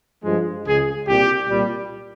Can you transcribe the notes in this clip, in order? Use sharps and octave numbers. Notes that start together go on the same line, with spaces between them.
G2 F3 G#3
C#2 C#3 G#3 G#4
C2 A#2 G3 G4
C2 A#2 G3